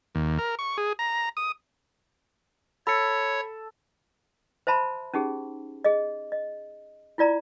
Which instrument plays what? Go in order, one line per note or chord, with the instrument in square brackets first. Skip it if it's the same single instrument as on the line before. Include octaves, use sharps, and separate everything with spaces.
[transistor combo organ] D#2
A#4
C#6
G#4
A#5
D#6
[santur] A4 [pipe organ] C#5 [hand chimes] B5 C#7
[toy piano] C5 E5 A5 B5 C6
C#4 D#4 G4 G#4
G#4 D#5
D#5
E4 F4 D5 A#5